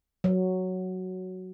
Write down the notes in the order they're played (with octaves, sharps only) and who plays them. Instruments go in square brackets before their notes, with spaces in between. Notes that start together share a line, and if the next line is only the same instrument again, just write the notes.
[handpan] F#3